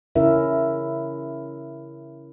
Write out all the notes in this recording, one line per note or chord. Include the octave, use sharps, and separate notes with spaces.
C#3 C#4 E4 A#4 E5